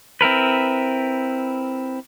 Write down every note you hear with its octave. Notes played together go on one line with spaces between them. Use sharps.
C4 E4 A#4 B4